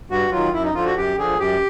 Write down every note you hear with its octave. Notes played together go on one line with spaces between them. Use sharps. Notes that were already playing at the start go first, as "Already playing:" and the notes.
G2 F#4
D#3 F#3 F4
F#2 E4
D#4
D3 F3 F4
F#4
F#2 G4
D3 F3 G#4
F#2 G4